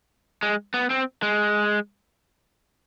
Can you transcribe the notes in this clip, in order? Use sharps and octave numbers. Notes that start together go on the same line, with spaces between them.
G#3
B3
C4
G#3